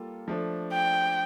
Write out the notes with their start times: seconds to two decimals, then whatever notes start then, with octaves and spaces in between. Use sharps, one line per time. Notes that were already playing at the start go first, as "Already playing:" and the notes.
Already playing: G3 A#3 F4 A4
0.28 F3 A3 D4
0.73 G5